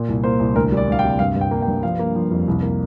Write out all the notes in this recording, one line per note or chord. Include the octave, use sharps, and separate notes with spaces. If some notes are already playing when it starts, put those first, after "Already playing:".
Already playing: A#2
C2
A#3 C5
C2
D2 A#4
G3 D5
D2 F5
G5
C3
G2 F5
G2
G5
A#3
G5
G2
F3 F5
A#3
F3
F2
C2
A#3